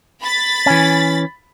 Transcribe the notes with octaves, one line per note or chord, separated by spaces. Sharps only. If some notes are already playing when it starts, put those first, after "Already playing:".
B5 A6
E3 C#4